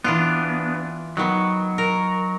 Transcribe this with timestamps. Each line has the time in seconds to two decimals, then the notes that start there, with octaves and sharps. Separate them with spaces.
0.04 E3 B3 D4 F4
1.17 D#3 F#3 B3
1.78 A#4